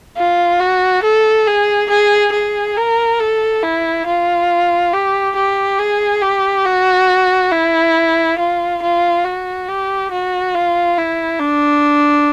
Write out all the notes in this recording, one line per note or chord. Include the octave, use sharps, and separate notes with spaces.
F4
F#4
A4
G#4
G#4
G#4
A#4
A4
E4
F4
G4
G4
G#4
G4
F#4
E4
F4
F4
F#4
G4
F#4
F4
E4
D4